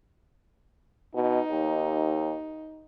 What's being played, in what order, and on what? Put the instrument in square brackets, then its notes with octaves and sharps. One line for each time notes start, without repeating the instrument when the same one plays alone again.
[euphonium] B2 [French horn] D#4
[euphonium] D#2